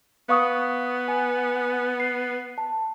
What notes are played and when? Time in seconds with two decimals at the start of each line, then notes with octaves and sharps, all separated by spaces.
0.29 B3 F5 C#6 D#6
1.08 G#5
2.00 C7
2.58 A5